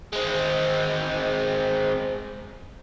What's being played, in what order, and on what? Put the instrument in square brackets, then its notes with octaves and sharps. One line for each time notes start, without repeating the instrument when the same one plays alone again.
[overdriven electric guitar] G#3 C4